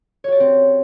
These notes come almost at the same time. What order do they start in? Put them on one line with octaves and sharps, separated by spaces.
C#5 F#4 D5 G4 C4